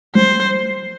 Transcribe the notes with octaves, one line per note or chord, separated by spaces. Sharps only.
G3 C5